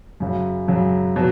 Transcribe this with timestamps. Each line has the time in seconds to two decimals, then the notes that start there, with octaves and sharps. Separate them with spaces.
0.20 F#2 C#3 F#3
0.68 F#2 C#3 F#3
1.16 B2 F#3